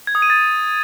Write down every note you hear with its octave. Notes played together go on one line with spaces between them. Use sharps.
G#6
D#6
D#7
A6